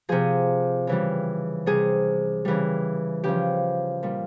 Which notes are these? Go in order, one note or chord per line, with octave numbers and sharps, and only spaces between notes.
C3 F3 G#4
C#3 E3 G3
C3 G3 G#4
C#3 E3 G3
C#3 F3 G4
A#2 G3